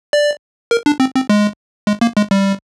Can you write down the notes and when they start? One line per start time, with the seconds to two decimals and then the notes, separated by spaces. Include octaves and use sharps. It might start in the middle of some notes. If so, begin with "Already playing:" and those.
0.13 D5
0.71 A#4
0.86 D4
1.00 C4
1.15 C4
1.29 G#3
1.87 G#3
2.01 A#3
2.17 G#3
2.31 G3